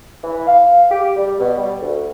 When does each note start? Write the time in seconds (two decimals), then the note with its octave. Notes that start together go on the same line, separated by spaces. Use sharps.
0.23 E3
0.47 F5
0.90 G4
1.16 G3
1.39 B2
1.57 G3
1.81 D2